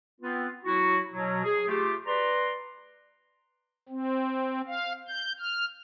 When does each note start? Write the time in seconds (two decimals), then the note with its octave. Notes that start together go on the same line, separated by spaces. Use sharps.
0.21 B3 C4 F4 B4
0.65 F#3 E4 F#4
1.11 B2 F#3
1.44 G#4
1.67 A3 F4 G4
2.06 B4 D5 A#5 C6
3.89 C4
4.67 F5
5.08 G6
5.40 F6